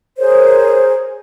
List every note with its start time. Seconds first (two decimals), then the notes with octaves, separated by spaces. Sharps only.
0.18 G#4 A#4 C5 C#5